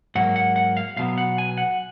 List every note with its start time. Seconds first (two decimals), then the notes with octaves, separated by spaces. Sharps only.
0.15 G#2 F#3 A#3 F#5
0.36 F#5
0.56 F#5
0.77 F5
0.97 B1 B2 F#3 B3 F5
1.18 F#5
1.38 G#5
1.58 F#5